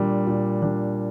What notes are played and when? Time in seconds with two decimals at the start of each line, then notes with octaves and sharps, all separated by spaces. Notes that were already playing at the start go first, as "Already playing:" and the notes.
Already playing: A#2 G3 D4
0.27 A#2
0.62 G3 D4